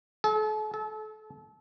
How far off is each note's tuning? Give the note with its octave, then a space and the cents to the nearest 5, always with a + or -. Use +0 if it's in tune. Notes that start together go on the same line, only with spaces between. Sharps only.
A4 -40
A4 -30